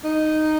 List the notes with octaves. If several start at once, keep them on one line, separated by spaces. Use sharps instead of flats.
D#4